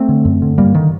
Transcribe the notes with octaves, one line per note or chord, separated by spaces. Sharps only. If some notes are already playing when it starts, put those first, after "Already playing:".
Already playing: A3 C4
D3
F#2
D3
G2 G3 A#3
D3 D#3